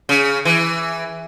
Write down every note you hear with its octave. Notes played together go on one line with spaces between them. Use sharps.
C#3
E3